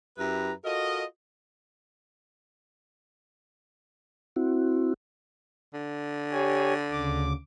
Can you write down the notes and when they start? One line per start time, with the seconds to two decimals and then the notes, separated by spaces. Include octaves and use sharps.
0.18 F#2 E4 G4 B4 E5 A#5
0.65 F4 F#4 A4 A#4 D#5
4.36 C4 E4 F#4
5.74 D3
6.32 G4 C#5 G#5
6.92 D2 C#3 D6